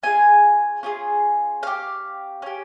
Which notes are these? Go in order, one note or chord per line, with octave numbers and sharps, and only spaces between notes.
C#4 F4 G#4 G#5
C#4 F4 G#4
C#4 G4 F5
C#4 G4